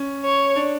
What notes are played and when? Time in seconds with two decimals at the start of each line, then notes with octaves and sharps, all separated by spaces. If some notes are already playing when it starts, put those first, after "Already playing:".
Already playing: C#4
0.25 C#5
0.56 D4